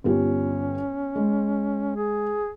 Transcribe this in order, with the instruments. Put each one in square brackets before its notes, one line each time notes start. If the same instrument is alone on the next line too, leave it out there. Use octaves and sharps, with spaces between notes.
[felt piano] G1 F4 G4 [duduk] C#4
[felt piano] G#3
[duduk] G#4